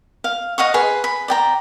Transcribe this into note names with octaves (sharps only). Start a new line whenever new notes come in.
F5
D#5 F5 F#5 C#6
G#4 B4 C6
B5
D5 G5 A#5